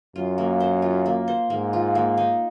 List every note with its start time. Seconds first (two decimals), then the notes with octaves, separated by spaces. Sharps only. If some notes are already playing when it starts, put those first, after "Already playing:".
0.16 F#2 F4
0.38 A#3
0.60 C5
0.82 F4
1.06 A#3
1.28 C5
1.50 G#2 A#3
1.73 F4
1.95 A#3
2.18 D#4